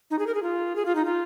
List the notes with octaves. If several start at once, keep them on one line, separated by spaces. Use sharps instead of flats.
D#4
G#4
A#4
G#4
F4
G#4
F4
D#4
F4